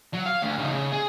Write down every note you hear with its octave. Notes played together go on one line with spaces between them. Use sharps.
F#3
F5
D2
C#3 D#4
C#3
G#4